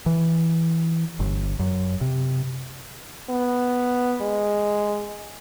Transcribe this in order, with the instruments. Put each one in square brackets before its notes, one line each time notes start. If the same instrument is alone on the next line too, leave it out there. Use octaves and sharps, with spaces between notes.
[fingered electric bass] E3
G1
F#2
C3
[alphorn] B3
G#3